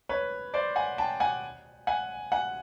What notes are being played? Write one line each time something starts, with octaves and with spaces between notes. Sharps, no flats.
B4 C#5
C5 D5
F#5 G#5
G5 A5
F#5 G#5
F#5 G#5
F#5 G#5